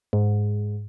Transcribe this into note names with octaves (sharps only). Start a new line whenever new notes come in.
G#2